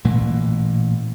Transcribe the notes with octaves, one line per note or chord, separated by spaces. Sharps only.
A1 A#2 E3 A#3